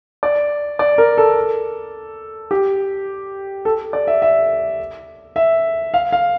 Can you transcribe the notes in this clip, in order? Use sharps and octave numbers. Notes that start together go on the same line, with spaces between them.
D5
D5
A#4
A4
G4
A4
D5
E5
E5
E5
F5
F5